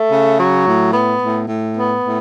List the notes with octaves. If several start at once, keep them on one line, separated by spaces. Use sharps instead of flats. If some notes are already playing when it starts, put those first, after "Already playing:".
Already playing: A3
C#3
F#3
A2
B3
A2
A2
B3
A2